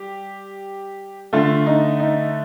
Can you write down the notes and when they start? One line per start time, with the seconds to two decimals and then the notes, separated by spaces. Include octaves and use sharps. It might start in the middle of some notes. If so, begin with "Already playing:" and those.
Already playing: G3 G4
1.33 D3 A3 F4
1.66 D#4
1.99 D#4